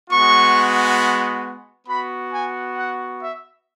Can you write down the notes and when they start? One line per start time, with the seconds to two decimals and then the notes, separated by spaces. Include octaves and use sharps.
0.10 G#3 B3 F#4 C#6
1.87 B3 F#4 B5
2.33 G#5
2.77 F#5
3.21 E5